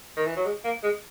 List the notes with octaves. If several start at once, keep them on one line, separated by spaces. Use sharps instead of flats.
D#3
E3
F#3
G#3
A#3
G#3